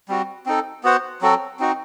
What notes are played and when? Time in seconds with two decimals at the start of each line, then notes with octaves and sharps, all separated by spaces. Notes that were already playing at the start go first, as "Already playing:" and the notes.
0.09 G3 C4 F#4
0.46 C4 D#4 A4
0.84 B3 F#4 C5 F#5
1.22 F#3 C4 F#4 A4
1.59 C4 D#4 F#4